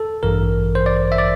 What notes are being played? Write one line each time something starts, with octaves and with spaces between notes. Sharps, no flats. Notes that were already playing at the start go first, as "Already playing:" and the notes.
Already playing: A4
A1 G2 E3 A#4
C5
D5
E5
D5